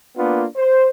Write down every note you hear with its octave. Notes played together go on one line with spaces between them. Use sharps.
A#3 B3 D4 F4
C5